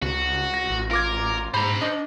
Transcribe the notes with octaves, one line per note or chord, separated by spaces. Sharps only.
C#2 F#4
A#6
A1
F4 A#4 D6 G#6
G#2 C5 A#5 B5
D4 D#5